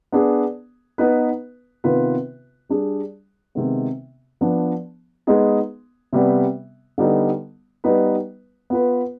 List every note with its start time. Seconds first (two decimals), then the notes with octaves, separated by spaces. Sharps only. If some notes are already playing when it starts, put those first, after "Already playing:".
0.12 B3 D4 G#4
0.98 B3 D#4 B4
1.84 C3 D#3 B3 F4 B4
2.69 G3 D4 G#4
3.55 C3 D#3 G#3 B3
4.41 F3 B3 D4
5.27 G#3 B3 D#4 G#4
6.13 C3 G3 B3
6.98 D3 G3 B3 D#4
7.84 G3 B3 D#4 B4
8.70 B3 F4 B4